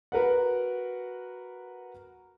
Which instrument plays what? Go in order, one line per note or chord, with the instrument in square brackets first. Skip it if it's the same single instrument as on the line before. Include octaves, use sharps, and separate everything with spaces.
[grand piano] F#4 A#4 B4 F#5